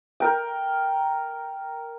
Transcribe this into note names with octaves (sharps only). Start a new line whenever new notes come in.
A#4 G5